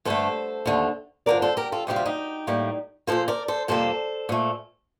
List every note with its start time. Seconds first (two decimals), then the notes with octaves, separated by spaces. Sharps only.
0.05 G2 D3 A3 A4 C5
0.66 D#2 D3 A3
1.26 G2 D3 F3 A#4 D5
1.42 A4 C5
1.57 G4 A#4
1.72 F4 A4
1.87 D2 C3 G3 A#3 G4
1.96 F4
2.05 D#4 G4
2.47 A2 G3 A#3
3.07 A#2 F3 A#3 A4 C5
3.28 A#4 D5
3.48 A4 C5
3.68 F2 C3 G3 A#3 A4 C5
4.29 A#2 A3